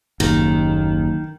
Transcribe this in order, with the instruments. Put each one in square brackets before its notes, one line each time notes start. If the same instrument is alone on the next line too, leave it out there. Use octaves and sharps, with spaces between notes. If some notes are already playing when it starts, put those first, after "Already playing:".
[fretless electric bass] F#1 D#2 [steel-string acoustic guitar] D#3